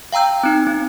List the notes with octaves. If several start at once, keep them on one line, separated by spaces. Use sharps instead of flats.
F5 G5 A#5 E6 G6
C4 D#4
C4